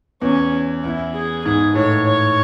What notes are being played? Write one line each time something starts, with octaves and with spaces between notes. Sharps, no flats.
E2 C#4
E2 E4
G#4
G#2 G#4
A2 C#5
C#5